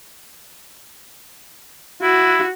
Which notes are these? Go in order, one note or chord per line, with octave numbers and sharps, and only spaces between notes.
E4 F#4